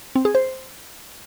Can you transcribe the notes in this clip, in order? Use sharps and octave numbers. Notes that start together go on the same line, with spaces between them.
C4
G#4
C5